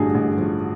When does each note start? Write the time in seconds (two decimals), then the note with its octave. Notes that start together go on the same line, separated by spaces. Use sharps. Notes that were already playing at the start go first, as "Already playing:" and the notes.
Already playing: A1 G2 D3 F#4 G#4
0.14 A1
0.38 F3